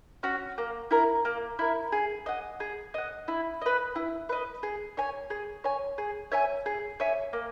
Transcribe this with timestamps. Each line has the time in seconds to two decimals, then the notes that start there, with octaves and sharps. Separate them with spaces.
0.23 C#4 F#4
0.58 A#3
0.91 E4 A#4
1.25 A#3
1.59 E4 A#4
1.92 G#4
2.26 D#5 F#5
2.60 G#4
2.94 D#5 F#5
3.28 E4
3.62 B4 D#5
3.96 E4
4.29 B4 D#5
4.63 G#4
4.97 C#5 G#5
5.30 G#4
5.64 C#5 G#5
5.98 G#4
6.32 C#5 E5 G#5
6.66 G#4
7.00 C#5 E5 G#5
7.33 A#3